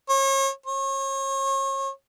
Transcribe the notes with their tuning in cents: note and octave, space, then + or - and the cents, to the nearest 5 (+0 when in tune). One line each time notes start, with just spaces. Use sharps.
C#5 -35
C#5 -35